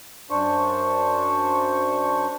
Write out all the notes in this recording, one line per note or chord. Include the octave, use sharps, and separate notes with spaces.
F#2 D4 C5 C#6